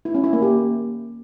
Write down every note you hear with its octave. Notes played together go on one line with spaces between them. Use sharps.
E4
C#4
E4
A#3
G4